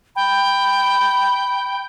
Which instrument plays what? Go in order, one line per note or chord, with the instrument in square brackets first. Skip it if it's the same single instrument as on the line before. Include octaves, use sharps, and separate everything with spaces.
[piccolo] G5 [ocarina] B5